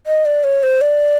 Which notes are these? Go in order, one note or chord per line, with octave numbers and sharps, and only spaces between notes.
D#5
D5
C#5
C5
D5